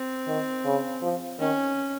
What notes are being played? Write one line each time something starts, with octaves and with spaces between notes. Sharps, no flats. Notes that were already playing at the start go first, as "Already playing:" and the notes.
Already playing: C4
D#3
C#3
F3
D#3 C#4